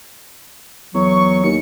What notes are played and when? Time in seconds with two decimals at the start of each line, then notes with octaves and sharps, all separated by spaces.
0.94 E2 F#3 C#6
1.44 D#2 C#7